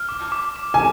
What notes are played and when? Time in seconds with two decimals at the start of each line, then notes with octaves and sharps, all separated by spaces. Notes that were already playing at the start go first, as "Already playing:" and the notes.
Already playing: F6
0.09 D6
0.32 D6
0.56 D6
0.74 G#5